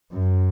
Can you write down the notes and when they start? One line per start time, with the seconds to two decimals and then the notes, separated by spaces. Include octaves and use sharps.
0.12 F#2